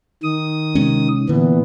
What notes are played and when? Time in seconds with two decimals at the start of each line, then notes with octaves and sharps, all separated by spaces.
0.23 D#3 D#6
0.75 C3 G#3 C#4
1.29 A#2 D3 E3 B3